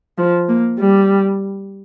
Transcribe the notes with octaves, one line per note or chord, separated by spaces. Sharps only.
F3
A#3
G3